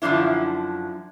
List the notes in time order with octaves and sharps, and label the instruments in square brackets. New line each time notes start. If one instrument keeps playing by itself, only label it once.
[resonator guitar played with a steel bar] F#2 D3 F3 D4 E4